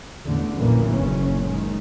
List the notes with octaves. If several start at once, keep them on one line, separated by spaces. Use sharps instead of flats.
A1 E2 D3 A3
A#1 F#2 A#2 E3 A#3
F#1 C#4
D#3 G#3